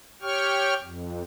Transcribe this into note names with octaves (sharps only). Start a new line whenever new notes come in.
G4 C#5 G5 C#6 F6
F2